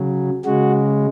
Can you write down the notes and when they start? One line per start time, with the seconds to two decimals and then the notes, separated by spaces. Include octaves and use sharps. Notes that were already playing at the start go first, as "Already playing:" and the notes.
Already playing: C#3 F#3
0.45 C#3 G#3 F#4